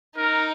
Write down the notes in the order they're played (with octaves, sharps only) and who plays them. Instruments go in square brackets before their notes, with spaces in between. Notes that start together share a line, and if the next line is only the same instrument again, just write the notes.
[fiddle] D#4 [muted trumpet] A#4